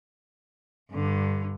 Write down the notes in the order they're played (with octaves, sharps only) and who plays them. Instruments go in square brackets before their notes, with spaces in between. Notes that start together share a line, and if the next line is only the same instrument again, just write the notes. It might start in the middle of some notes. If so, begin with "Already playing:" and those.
[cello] G2 D3